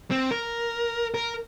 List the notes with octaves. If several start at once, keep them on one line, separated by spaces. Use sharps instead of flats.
C4
A#4
A#4